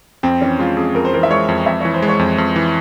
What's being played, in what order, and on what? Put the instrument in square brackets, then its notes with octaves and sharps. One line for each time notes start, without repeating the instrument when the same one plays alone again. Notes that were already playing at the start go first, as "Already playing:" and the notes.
[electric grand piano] F2 [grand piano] C4
[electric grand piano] E3 [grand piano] C#4
[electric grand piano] G#3 [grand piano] F4
[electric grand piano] F2 [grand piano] G#4
[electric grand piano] F2 [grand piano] A#4
[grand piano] C5
[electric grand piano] E3 [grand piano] A#4
[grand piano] E5
[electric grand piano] G#3 [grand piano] C#5
[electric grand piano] F2
[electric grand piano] F2 [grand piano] E5
[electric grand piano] E3 [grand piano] C#5
[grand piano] C5
[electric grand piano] G#3
[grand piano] C#5
[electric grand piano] F2
F2
E3